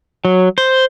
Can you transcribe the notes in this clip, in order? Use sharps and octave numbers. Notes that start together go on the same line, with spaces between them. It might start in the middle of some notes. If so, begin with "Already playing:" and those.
F#3
C5